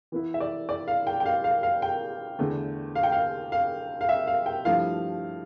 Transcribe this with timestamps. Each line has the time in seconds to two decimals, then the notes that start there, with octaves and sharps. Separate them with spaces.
0.12 E3 B3 E4
0.34 E5
0.40 D5
0.69 D5
0.88 F5
1.07 G5
1.20 G5
1.26 F5
1.44 F5
1.63 F5
1.82 G5
2.39 E2 D3 A3
2.95 F5
3.03 G5
3.12 F5
3.52 F5
4.01 F5
4.09 E5
4.27 F5
4.46 G5
4.65 G2 F3 A3 E4 F5